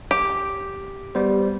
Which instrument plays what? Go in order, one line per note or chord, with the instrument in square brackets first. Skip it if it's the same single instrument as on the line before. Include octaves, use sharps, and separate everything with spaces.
[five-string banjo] G4
[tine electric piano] G3 B3 C5